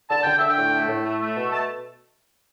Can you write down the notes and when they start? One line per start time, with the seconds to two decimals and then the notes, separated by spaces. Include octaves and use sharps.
0.09 D3 A5
0.22 D3 G5
0.37 D3 E5
0.49 G5
0.57 A2
0.72 A3
0.88 A2
1.04 A3
1.20 A3
1.36 B2
1.51 A3 A5